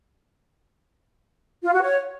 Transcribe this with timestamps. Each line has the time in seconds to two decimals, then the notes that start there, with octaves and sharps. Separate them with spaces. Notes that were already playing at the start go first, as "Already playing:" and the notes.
1.63 F4
1.72 F#4
1.82 C#5